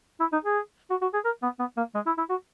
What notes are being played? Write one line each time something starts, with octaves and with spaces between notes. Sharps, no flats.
E4
D#4
G#4
F#4
F#4
G#4
A#4
B3
B3
A#3
G#3
E4
E4
F#4